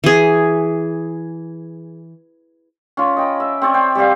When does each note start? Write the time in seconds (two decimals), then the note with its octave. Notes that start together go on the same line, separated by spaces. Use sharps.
0.04 E3 G#4
2.97 C#4 F4
3.16 D#5 G5 B5
3.40 E5
3.62 C4 C#5 D5
3.74 C5 G5
3.95 G3 C4 G4 F5